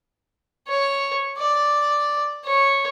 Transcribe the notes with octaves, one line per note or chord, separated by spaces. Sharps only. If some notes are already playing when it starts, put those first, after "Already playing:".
C#5
D5
C#5